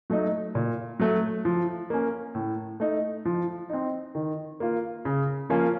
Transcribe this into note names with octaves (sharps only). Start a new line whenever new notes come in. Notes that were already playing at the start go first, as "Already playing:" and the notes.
F#3 A3 D#4
A#2
F#3 A3
F3
A#3 C#4
A2
A3 D#4
F3
C4 D#4
D#3
A#3 F4
C#3
F3 A#3 C#4 F4